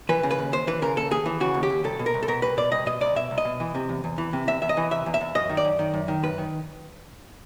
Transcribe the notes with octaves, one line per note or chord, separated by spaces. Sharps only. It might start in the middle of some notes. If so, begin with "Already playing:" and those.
E3 B4
C#3
B4
D#2
D#2 C5
E3 B4
C#3 A#4
D#2 A4
D#2 G#4
E3
C#3 F#4
D#2
G4
D#2
C2 A4
B2
A#4
C2
A4
B2 A#4
C2 B4
B2 D5
C2 D#5
B2 D#5
C2 D5
B2 E5
C2
D#5
B2
E3
C3
E2
E2
E3
C3
E2 E5
E2 E5
D#5
E3
C3 E5
E2
E5
E2
F#2 D#5
D#3
D5
F#2
D#3
F#2
D#3
F#2 B4
D#3